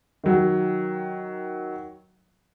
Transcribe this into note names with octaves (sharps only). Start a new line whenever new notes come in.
D#3 F#3